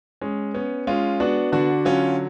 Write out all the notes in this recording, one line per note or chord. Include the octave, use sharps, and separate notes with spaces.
G#3 C#4
B3 C#4
G#3 C#4 F4
B3 D4 F#4
D3 D4 F#4
F#3 C#4 F4